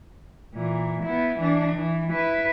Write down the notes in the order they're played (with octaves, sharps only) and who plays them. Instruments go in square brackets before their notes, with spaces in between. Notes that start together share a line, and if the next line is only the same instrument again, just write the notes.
[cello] A#2 E3
B3 E4
E3 D4
E3
E4 B4